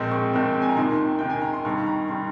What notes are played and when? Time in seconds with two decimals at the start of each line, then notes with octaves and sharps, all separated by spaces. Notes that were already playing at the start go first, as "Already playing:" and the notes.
Already playing: A#1 A#2 G#3 C4 C6
0.12 C#6
0.33 A#1 A#2 G#3 C4
0.62 G#5
0.69 A#5
0.77 D#2 D#3 A#3 C6
1.19 D#2 D#3 A#3 G5
1.30 G#5
1.42 A#5
1.53 C6
1.65 G2 D#3 G3 C#6
1.86 A#5
2.08 D#3 G3 C6